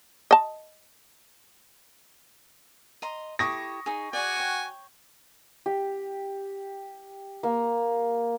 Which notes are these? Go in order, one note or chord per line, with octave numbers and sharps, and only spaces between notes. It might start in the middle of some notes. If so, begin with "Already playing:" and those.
D#5 A5
D#5 A#5 C6
E4 G4 A4 C#6 D#6 A#6
D#4 G#4
F#4 G#4 D5 G#5
C#5 G5
G4
A#3